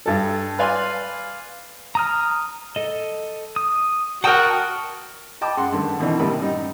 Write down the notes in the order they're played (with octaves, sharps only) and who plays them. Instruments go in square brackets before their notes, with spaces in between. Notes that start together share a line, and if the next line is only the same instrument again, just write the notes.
[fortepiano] G2 A4
B4 D5 F5 G#5 C6
[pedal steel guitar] A#5 D#6 F6
A4 D#5
D#6
[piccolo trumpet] F#4 [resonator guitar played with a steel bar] A#4 G5 [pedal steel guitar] F#5 A5 D#6
[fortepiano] D#5 G5 A5 B5 D6
F#2 G#3 F#5 C6
G2 D3 D#3 A3
B2 D#3 E3 C4 D4 D#4
A2 C3 D#3 G3 A#3 B5
F#2 G3 D#4